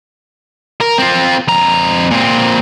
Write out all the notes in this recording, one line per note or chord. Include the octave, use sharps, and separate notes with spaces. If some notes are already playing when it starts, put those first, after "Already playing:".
A#4
C4 F4
F2 A#5
A#2 C4